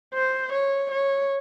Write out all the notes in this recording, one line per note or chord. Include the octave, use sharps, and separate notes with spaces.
C5
C#5
C#5